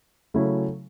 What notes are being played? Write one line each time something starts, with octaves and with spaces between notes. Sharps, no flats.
C#3 F#3 A3 C#4 E4